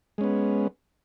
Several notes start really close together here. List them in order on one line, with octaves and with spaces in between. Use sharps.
G#3 C#4 B3